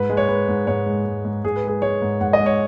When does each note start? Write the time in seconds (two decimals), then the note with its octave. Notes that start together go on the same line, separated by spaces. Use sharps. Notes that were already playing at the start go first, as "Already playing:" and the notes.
Already playing: G#2 B4
0.10 G#3
0.17 C#5
0.28 G#3 B4
0.48 G#2
0.67 G#2 C#5
0.86 G#3
1.06 G#3
1.25 G#2
1.44 G#2 G#4
1.56 B4
1.64 G#3 G#4
1.82 G#3 C#5
2.02 G#2
2.21 G#2 F#5
2.33 D#5
2.40 G#3
2.46 C#5